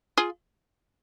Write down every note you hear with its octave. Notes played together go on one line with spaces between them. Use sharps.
F4 G#4